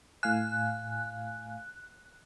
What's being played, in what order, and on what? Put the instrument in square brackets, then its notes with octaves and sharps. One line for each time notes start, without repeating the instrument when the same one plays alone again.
[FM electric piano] A2 F5 G#5 [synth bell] F#6